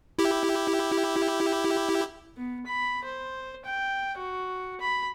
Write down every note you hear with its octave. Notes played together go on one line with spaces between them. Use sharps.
E4 G4
B3
B5
C5
G5
F#4
B5